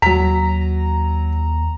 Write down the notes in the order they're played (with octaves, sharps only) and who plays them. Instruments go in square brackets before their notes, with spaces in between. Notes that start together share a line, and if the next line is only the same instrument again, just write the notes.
[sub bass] D#2 [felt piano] F#3 B6 [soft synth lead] A#5